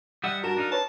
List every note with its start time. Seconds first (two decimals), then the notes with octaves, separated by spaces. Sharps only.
0.24 G3 D#5 E5 F#5
0.43 G2 F#4 A#4 A5
0.57 D4 D#4 F5
0.72 B4 C#5 A5